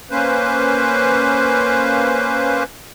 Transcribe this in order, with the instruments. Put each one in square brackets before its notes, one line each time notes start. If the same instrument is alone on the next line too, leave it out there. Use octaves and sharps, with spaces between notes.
[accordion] A#3 C#4 B4 C5